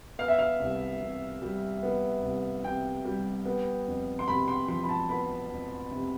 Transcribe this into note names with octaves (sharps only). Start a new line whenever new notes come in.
B3 F5
E5
F5
C2
C3
G3
B3
C2
C3 G5
G3
B3
F2
C6
C3 B5
C6
F3 C6
B5
A5
B3 B5
F2
C3